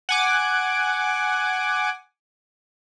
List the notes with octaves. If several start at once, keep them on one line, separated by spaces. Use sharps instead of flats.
F#5 G#5 D6